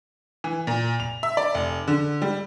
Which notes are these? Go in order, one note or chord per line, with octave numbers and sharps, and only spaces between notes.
E3
A#2
F7
E5
D5
F1
D3
G3